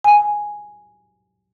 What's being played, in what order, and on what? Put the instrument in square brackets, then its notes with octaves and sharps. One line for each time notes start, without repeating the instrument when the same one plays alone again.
[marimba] G#5